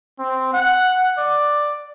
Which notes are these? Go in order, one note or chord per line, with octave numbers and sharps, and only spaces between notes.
C4
F#5
D5